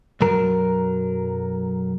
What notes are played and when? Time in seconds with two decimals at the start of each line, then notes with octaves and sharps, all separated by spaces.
0.21 B1 F#2 F#3 A#4